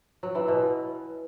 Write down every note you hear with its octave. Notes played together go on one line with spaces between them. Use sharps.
F#3
E3
B2